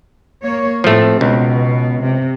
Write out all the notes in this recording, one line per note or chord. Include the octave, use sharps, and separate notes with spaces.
A#3 C#5
A2 F3 A3 C4
C#2 B2
C3